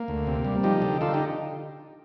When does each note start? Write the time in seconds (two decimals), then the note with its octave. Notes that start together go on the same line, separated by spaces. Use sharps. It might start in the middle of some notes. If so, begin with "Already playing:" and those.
Already playing: A#3
0.08 D2
0.27 C3
0.45 G3
0.63 F3 D#4 G4
0.82 D3
1.01 D3 F4 A4
1.13 D#4 G4